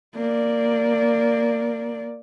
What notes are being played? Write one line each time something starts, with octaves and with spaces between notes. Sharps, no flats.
A#3 D5